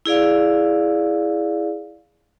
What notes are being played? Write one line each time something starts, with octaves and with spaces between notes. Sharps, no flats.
E4 G#4 D5 F5